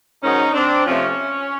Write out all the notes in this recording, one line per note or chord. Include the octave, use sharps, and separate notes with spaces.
G#2 D#3 F#3 C#4 D#4
C4 D4
C3 F3 A3 C4 C#4